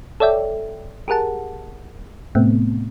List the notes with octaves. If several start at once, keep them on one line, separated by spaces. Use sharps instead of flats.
A4 C#5 D5 E5 G5
G4 G#4 A#4 F#5 A5
A2 C3 A3 B3 C4